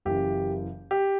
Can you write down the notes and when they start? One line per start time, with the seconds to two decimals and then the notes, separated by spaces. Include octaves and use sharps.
0.05 F#1 F#2 E3 G4
0.91 G4